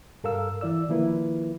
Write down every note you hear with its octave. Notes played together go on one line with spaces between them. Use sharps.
G2 A4 A#4 F5 E6
E3 E4 D5 E6
D#3 F3 A#3 E4 B4